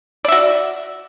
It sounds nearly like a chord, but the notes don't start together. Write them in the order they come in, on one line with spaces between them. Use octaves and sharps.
D5 E5 F#4